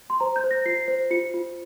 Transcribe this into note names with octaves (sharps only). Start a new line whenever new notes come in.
C6
C5 A#5
G6
C5
A#6
F4 C7
C5
F4 C#7
F4